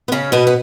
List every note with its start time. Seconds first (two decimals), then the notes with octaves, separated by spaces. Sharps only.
0.08 B3
0.12 C#3 C#4
0.32 B2 B3
0.47 B3